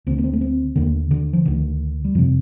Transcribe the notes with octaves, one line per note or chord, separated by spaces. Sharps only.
D2 D3 C4
A#3
C4
A3
C4
D#2 D3 A#3
D3
F3
D2 D3 D#3
G3
F2 C3 F3